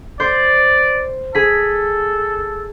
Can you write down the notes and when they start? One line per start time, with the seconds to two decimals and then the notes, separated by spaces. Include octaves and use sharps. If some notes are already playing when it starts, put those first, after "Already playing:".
0.20 C5 D5
1.35 G#4 A4 B6